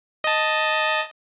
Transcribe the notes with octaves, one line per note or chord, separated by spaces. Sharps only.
D#5 A5